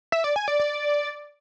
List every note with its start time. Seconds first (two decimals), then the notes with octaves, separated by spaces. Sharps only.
0.12 E5
0.24 D5
0.36 G#5
0.48 D5
0.59 D5